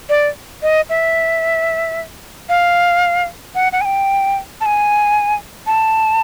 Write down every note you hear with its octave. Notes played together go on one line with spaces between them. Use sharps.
D5
D#5
E5
F5
F#5
F#5
G#5
G5
A5
G#5
A5